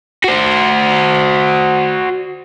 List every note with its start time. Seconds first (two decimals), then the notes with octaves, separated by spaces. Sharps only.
0.24 F#4 C5